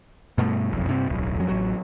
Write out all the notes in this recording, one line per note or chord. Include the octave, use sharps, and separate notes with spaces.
G2 B2 A3
F#1 B1 F2
G2 C3 C4
D1 B1
F2 F#3
A1 F#3